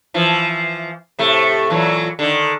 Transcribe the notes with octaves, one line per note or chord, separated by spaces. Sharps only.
E3 F3
A2 C3 A3
A#2 E3 F#3
D3 D#3